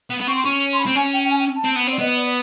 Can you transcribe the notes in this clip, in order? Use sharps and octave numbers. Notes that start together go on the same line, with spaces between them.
B3
B3
C4 C#6
C6
C#4 C#6
C6
B5
C4
C#4 G#5
G5
G5
G#5
G5
A5
C4
B3
C4
D5
B3 D#5
D5